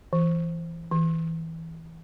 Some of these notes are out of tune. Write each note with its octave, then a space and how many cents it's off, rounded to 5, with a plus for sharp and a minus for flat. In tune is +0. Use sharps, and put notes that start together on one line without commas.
E3 +10
E3 -20